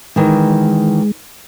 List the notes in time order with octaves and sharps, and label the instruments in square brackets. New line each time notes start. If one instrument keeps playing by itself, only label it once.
[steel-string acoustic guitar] D#3 E3 [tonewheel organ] G#3